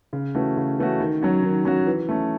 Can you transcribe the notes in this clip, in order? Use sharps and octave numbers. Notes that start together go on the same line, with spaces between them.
C#3
E3 A3 C#4 F#4
C#3
E3 A3 C#4 F#4
D#3
F#3 C#4 F#4
D#3
F#3 C#4 F#4
E3
A3 C#4